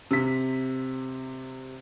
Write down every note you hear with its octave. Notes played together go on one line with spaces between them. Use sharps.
C3 B6